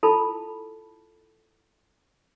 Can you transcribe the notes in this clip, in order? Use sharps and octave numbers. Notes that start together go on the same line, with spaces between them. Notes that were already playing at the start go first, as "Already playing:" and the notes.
E4 F4 A4 A5 B5